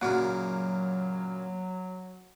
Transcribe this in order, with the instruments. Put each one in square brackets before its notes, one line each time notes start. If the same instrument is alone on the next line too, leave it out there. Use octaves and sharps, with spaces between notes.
[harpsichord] F#2 A#2 C#3 [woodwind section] F#3 [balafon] A#3 F#4